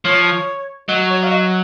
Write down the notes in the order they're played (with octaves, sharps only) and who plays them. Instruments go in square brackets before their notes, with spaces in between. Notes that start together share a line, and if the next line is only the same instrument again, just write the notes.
[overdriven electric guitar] F3 [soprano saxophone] C#5
[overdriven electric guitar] F#3 [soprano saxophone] D#5
[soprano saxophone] C#5
F5
D#5